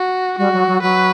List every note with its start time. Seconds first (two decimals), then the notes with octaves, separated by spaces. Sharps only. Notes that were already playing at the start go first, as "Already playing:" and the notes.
Already playing: F#4
0.38 G3 F#4
0.53 F#3
0.68 F#3
0.82 F#3 B4